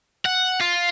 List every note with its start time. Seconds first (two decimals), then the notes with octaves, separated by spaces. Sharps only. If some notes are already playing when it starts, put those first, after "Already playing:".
0.25 F#5
0.60 F4